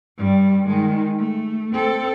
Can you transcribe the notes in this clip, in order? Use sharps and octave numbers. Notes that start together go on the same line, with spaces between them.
G2 G3
D#3 G#3
A3
C4 A4